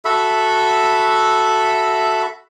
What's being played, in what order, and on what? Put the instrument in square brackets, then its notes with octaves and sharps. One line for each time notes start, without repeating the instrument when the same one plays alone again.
[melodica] F#4 A4 E5 B5